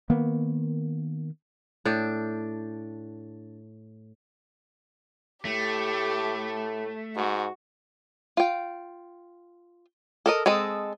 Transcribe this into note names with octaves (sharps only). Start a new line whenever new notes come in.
D#3 A#3 B3
A2 D4
A2 A3 G4
G#2 F#4
F4 G5
A4 A#4 D#5
G#3 C4 A4 D#5